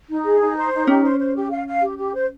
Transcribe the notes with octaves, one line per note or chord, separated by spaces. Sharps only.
D#4
G#4
D#4
C5
D#4
C#4 G4
C5
C5
G4
F5
F5
G4
G4
C5